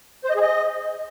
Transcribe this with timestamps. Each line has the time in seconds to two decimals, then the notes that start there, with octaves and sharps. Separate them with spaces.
0.24 C5
0.30 D#5
0.36 G#4
0.41 D#5